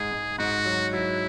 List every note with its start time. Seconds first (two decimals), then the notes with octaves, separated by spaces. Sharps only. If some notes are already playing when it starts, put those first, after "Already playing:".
Already playing: G#2 G#4
0.11 G#2
0.38 G#2 F#4
0.65 F#3
0.93 F#3 E4